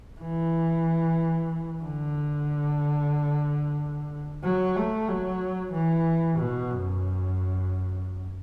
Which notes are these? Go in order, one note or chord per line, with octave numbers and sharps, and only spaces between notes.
E3
D3
F#3
A3
F#3
E3
B2
F#2